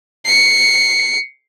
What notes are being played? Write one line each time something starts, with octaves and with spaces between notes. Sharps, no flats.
C7 C#7